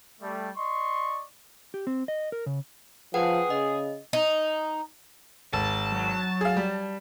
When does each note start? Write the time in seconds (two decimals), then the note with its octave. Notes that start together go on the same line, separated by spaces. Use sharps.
0.20 G3 A3
0.56 D5 D#5 C6 C#6
1.74 G4
1.87 C4
2.08 D#5
2.32 A#4
2.46 C#3
3.14 F3 G#4 B4 F#5 G5
3.50 C#3 D#5
4.13 D#4
5.53 G#1 A5
5.92 F#3
6.41 G#4 F5
6.56 G3